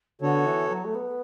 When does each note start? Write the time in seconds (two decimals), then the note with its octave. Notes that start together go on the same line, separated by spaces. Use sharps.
0.20 D3 B3 F#4 A4 C#5
0.46 E3
0.69 F#3
0.85 A3
0.95 B3